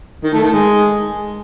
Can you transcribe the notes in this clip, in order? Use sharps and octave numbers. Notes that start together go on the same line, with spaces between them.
D#3
A3
D#3
G#3